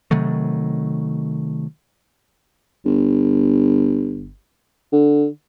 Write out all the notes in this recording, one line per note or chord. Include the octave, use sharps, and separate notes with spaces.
C3 D#3 F#3 A3
G1
D3